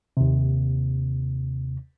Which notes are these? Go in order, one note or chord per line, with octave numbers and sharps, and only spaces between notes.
D#2 C3